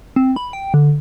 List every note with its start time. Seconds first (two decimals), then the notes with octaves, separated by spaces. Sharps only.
0.16 C4
0.36 B5
0.53 G5
0.74 D3